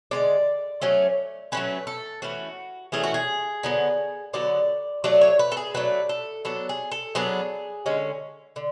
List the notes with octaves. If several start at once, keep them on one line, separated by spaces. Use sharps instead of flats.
D3 G#3 D4 D5
F#3 A3 C#4
F#3 A3 C#4 B4
A4
E3 A3 C#4 F#4
E3 A3 C#4 G#4
F#4
G#4
D3 F#3 B3
D3 F#3 B3 D5
F#3 A3 D4 D5
C#5
B4
A4
G#4
F#3 A3 D4 B4
A4
F#3 B3 D4 A4
G#4
A4
F#3 B3 D4 G#4
D3 G#3 C#4
D3